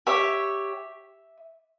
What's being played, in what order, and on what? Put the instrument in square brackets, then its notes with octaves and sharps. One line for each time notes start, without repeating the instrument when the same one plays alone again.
[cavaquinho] G4 C#5 E5